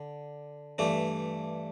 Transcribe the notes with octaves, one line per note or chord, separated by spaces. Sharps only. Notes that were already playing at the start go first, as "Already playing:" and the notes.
Already playing: D3
G2 E3 A3 D4